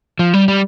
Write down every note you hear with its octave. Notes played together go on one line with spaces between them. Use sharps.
F3
G3
G3